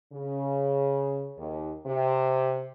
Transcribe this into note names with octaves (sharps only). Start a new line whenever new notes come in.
C#3
D#2
C3